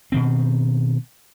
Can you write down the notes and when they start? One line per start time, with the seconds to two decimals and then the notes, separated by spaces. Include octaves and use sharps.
0.12 B2 D#3 C4